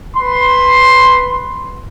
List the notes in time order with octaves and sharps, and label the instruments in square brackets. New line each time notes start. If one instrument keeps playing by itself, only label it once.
[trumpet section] B4 C6